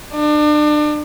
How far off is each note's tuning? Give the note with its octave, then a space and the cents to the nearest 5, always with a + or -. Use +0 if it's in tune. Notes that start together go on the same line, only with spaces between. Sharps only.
D4 +35